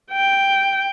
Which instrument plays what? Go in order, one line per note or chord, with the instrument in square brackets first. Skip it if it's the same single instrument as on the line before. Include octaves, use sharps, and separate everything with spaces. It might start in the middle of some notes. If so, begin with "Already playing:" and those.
[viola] G5